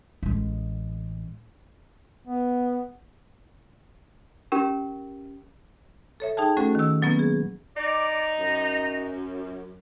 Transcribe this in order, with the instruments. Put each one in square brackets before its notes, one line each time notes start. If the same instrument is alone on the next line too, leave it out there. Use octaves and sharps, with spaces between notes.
[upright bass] A1 G#3
[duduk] B3
[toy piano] C#4 G4 A#4
[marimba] A4 C#5 E5
D#4 G#4 G5 A5
A3 C#4 F#4 A4 C5 F#5
D#3 E6
B2 F#3 A#3 B3 C#4
G#4
[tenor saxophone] D#4 [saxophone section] D5
[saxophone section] F#2